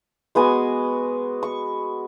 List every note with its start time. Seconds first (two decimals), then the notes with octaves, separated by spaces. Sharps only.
0.35 G#3 B3 F#4 G#5
1.43 C#6